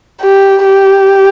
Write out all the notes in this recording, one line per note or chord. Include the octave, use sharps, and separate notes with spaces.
G4
G4